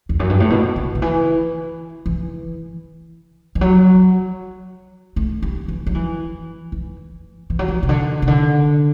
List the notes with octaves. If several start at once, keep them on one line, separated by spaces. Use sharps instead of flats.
E2
F#2
G2
A2
B2
D3
D3
E3
E3
E3
F#3
A3
G3
E3
F#3
E3
E3
E3
F#3
E3
C3
D3
C3
D3